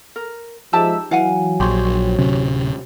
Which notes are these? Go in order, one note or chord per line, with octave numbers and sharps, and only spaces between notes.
A#4
F3 G#3 D#4 G4 E5 A5 E6
E3 F#3 F5 F#5 G#5
A#1 G4 C5 C#5
D1 C3 C#4